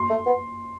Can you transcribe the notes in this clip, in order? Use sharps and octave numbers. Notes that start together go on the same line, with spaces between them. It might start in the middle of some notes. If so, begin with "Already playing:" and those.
Already playing: C6
A3
B3